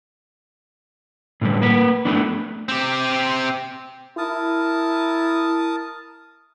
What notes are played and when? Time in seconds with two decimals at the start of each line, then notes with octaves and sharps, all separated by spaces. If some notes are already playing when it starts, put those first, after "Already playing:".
1.41 A2 D3 G3
1.62 A#3 B4
2.05 A3 B3 D4
2.69 C4 G4
4.18 E4 A#4 A5 D#6